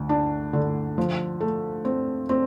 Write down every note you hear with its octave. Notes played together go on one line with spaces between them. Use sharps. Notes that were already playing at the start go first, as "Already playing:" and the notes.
Already playing: D2
D4
D3
F3
A3
C4
C4